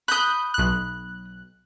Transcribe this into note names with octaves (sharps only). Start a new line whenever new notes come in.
B5 D#6 F#6 G6
B1 F#6